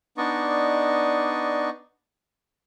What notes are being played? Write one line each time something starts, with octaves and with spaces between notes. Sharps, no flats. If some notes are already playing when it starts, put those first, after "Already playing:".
B3 D4 D#4 D5 D#5 C#6